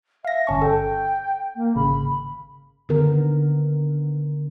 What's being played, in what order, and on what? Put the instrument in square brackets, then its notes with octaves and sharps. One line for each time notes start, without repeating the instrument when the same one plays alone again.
[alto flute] E5 [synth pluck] F5 A#6
[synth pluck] G1 C#4 C#6 [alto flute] A5
[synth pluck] A4 [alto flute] G5
[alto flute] A#3
[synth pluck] G#1 C#3 [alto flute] B5
[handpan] D3 D#3 B3 A#4